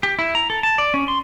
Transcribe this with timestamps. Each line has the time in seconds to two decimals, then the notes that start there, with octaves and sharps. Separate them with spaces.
0.03 G4
0.19 E4
0.35 A#5
0.50 A4
0.63 A5
0.78 D5
0.94 C#4
1.08 C6